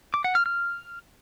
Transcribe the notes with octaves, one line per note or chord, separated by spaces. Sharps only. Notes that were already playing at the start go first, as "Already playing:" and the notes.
D6
F#5
F6
F6